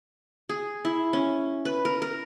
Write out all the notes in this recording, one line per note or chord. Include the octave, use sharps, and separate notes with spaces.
G#4
E4
C#4
B4
A#4
A#4